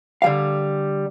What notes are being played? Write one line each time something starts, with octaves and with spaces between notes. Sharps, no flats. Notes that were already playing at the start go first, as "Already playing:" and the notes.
D3 G3 F5